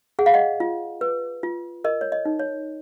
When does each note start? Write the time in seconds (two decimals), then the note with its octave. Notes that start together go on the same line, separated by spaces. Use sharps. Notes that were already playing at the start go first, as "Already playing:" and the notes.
0.19 G#4 F#5
0.26 F5
0.34 D#5 F#5
0.60 F4
1.01 B4
1.43 F4
1.84 A#4 D#5
2.01 C#5
2.12 D#5
2.25 D#4
2.39 C#5